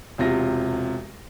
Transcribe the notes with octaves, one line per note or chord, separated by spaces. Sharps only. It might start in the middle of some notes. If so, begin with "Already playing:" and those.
E1 C3 F4 A#6